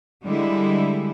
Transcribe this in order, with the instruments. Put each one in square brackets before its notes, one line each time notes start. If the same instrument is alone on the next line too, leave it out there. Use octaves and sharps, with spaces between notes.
[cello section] D3 G3 G#3 E4